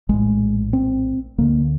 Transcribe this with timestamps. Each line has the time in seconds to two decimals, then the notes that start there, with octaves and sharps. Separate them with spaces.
0.09 A#1 A2 G#3
0.73 C4
1.38 D2 D3 A#3